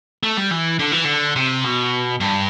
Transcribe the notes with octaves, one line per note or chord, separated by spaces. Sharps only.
A3
G3
E3
D3
E3
D3
C3
B2
G2